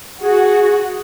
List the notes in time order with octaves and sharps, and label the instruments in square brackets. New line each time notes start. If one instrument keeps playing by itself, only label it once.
[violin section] F#4 [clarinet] G#4